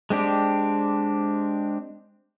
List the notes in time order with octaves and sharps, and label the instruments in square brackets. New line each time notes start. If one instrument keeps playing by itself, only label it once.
[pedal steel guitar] G#3 C4 D4 G4